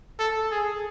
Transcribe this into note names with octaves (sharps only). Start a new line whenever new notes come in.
A4
G#4